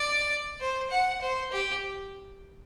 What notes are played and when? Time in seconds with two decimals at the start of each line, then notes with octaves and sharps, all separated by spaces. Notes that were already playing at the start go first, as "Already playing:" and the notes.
Already playing: D5
0.60 C5
0.90 F#5
1.21 C5
1.52 G4